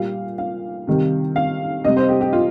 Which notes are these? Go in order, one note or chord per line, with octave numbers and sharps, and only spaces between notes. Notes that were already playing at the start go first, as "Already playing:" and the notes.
Already playing: A#2 G3 F5
F5
C3 D#3 G3
F5
C3 G3 D#5
C5
G4
G4
F4